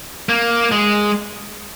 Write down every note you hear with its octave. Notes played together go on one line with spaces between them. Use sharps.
A#3
G#3